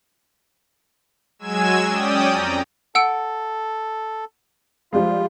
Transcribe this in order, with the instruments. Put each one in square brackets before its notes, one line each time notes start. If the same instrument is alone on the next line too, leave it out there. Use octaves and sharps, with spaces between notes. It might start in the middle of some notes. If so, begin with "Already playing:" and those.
[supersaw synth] F#3 G#3 G#5 E6 G#6 E7
C#4 D5 G5 D#6
F2 A#5
[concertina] A4 [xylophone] F#5 E6 D7
[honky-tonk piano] F3 G3 G#3 [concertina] F4